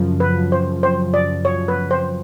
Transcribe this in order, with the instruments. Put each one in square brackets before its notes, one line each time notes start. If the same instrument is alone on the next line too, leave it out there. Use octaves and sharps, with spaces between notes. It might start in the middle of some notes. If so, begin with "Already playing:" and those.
Already playing: [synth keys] F#2 C#3 F3
[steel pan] B4
C5
C5
D5
C#5
B4
C5